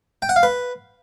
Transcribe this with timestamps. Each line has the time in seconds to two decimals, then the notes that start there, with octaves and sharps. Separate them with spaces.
0.22 G5
0.29 F#5
0.36 F5
0.43 B4